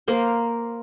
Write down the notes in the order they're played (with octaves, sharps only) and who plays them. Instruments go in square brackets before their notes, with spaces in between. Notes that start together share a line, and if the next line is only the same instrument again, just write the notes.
[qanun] A#3 A#4 C5